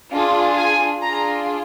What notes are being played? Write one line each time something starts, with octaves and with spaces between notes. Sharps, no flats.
D4 F4 G#4
G#5
D4 F4 G#4 A#5